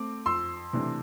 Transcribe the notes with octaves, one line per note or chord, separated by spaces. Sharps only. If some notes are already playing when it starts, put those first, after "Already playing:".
Already playing: A3 C4 D6
F2 C6 E6
C3 E3 A3 D4